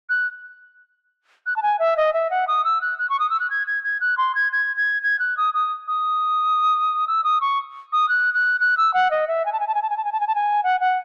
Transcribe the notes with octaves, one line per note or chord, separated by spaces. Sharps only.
F#6
F#6
A5
G#5
E5
D#5
E5
F#5
D#6
E6
F#6
F#6
C#6
D#6
E6
F#6
G#6
G#6
G#6
F#6
C6
G#6
G#6
G#6
G#6
F#6
D#6
D#6
D#6
E6
D#6
C#6
D#6
F#6
F#6
F#6
E6
F#5
D#5
E5
G#5
A5
G#5
A5
G#5
A5
G#5
A5
G#5
A5
G#5
A5
G#5
F#5
F#5